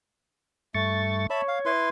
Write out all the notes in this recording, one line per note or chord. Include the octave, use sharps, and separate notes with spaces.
G2 A3 C#6 A6
C#5 E5 A5 B5
F5
E4 B4 C6